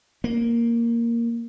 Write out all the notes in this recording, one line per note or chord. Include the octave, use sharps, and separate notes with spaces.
A#3